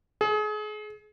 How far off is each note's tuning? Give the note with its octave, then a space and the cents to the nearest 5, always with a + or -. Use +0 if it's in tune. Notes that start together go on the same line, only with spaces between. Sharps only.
G#4 +35